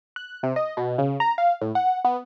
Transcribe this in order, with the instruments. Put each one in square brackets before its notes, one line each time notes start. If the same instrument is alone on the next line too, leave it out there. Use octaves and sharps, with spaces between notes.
[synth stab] F#6
C3
D#5
B2
C#3
A#5
F5
A2
F#5
B3